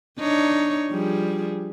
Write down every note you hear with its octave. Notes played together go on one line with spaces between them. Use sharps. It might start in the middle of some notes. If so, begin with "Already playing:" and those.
D4 D#4 C#5
F3 G3 G#4